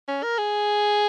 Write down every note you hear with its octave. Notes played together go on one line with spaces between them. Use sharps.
C#4
A#4
G#4